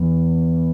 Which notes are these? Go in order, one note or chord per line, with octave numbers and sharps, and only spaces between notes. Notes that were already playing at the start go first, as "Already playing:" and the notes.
Already playing: E2